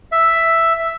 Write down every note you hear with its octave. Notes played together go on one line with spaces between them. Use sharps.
E5